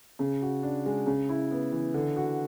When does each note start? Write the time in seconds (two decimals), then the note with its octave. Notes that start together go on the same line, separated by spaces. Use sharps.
0.19 C#3
0.42 F#4
0.63 D4
0.86 G#3
1.07 C#3
1.29 E4
1.51 B3
1.72 E3
1.94 D3
2.16 F#4